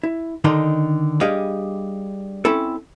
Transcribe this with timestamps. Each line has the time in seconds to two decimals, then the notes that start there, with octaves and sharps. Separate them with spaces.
0.03 E4
0.44 D3 D#3 D4 D#4 A#5 C6
1.21 G3 D4 G4 G#4 D#5 F5
2.45 C4 C#4 E4 A4